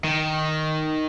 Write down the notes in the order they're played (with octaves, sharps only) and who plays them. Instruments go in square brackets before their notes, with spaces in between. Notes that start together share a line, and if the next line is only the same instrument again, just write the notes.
[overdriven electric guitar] D#3